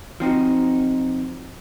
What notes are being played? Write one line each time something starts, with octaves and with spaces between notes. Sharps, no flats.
F3 C4 D#4 F#4